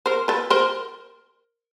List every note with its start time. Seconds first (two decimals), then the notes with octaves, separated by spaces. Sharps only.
0.06 A#4 C5
0.28 A4 B4
0.50 A#4 C5